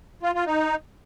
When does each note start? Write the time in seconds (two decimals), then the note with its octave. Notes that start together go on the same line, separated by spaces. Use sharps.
0.23 F4
0.35 F4
0.47 D#4